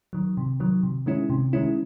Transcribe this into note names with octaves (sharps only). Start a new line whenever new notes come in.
D#3 F#3
C3
D#3 F#3
C3
D#3 G#3 C#4 E4
C3
D#3 G#3 C#4 E4